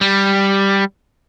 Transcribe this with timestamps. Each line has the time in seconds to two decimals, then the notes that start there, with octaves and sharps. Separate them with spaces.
0.01 G3